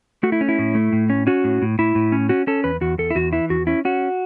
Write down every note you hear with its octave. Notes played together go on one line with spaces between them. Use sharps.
A3 F#4
E4
C#4
E4
A2
A3
A2
C#4
C#4 F#4
A2
A2
A2 E4
A2
C#4
C#4 F#4
C#4 A4
E2 B4
E2 F#4
E2 A4
E4
E2 F#4
E3 E4
E2 F#4
C#4 E4
C#4 F#4